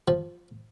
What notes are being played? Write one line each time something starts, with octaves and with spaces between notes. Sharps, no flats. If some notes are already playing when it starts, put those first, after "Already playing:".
F3